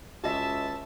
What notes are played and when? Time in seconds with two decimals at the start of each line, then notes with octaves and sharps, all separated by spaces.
0.24 C#2 F#4 D#5 E5 A5